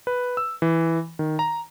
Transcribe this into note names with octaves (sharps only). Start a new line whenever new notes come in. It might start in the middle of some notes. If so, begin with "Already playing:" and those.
B4
E6
E3
D#3
A#5